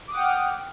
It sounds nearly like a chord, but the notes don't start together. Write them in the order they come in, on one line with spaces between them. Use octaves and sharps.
D6 D#6 F#5 G5 F6